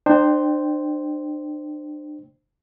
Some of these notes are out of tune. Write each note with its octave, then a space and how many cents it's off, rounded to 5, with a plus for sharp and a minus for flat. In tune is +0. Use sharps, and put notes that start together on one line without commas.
D4 +35 C5 +0 G5 +0